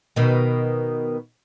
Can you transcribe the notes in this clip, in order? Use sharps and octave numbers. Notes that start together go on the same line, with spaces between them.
B2 D#3